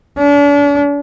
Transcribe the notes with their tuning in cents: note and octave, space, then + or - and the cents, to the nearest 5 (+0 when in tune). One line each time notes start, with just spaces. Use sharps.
D4 -40